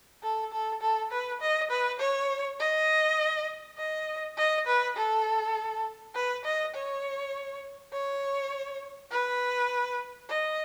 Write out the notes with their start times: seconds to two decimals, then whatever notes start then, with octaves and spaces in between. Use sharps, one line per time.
0.23 A4
0.52 A4
0.81 A4
1.11 B4
1.41 D#5
1.71 B4
2.00 C#5
2.60 D#5
3.77 D#5
4.37 D#5
4.67 B4
4.96 A4
6.15 B4
6.45 D#5
6.74 C#5
7.93 C#5
9.11 B4
10.29 D#5